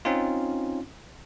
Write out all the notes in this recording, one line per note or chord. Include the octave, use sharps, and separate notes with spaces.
C4 C#4 D#4 F4